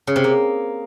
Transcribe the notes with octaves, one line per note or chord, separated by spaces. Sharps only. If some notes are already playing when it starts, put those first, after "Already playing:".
C#3
C3
A#3